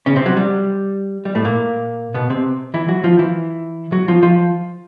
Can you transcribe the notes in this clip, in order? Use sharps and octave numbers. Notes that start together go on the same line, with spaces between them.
C#3 C#4
C3 C4
F#3
G3
G3
A2 A3
A#2 A#3
B2 B3
C3 C4
E3 E4
F#3 F#4
F3 F4
E3 E4
F#3 F#4
F3 F4
F3 F4